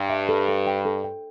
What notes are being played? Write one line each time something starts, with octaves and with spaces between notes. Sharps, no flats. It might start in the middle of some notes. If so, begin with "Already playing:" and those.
Already playing: G2
E5
A4
A4
G5
A4
G5